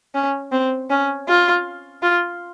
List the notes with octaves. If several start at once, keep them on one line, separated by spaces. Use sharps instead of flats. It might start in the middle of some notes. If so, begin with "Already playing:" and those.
C#4
C4
C#4
F4
F4